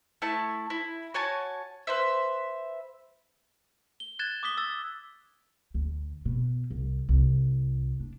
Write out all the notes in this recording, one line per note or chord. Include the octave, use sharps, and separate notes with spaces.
A3 E4 A5
E4
F#4 C#5 G#5 A5
B4 C5 E5
G7
F#6 G#6 A6 E7 G7
D6 D#6 B6 G7
E6 A6
D2
B2
C2
C2
D4